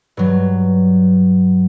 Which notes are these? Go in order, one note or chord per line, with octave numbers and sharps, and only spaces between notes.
G2 F#3